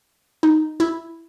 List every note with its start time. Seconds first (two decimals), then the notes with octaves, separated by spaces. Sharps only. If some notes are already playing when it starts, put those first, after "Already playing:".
0.43 D#4
0.80 E4